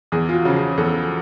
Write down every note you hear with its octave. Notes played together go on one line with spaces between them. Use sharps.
E2 G#4
F4
F#4
C#3 F3
G#4
E2 A4